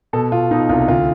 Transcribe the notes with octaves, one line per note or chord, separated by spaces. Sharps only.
B2 A4
B2 F4
B2 D#4
C2 F4
D2 F4